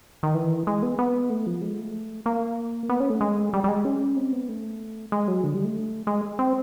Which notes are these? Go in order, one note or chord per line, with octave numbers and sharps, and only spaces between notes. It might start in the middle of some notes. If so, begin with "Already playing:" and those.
D#3
E3
G#3
B3
B3
A3
F3
G#3
A3
A#3
B3
C#4
A3
G#3
G3
G3
G#3
C#4
C4
B3
A3
G#3
F#3
D3
G3
A3
G#3
C4